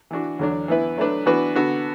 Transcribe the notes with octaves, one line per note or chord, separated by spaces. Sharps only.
E3 D4 F#4
E2 D3 F#3 D4
E3 B3 E4 B4
F#3 A3 D4 B4
E3 B3 D4 F#4 B4
D3 B3 F#4 A4